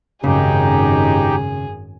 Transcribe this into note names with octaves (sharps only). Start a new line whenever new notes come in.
G#1 F#2 C#3 D#4 G4 G#4